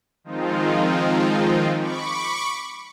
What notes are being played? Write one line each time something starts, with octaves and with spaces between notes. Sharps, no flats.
D#3 F3 G#3 C4 D#4 F4
B5 C#6 D6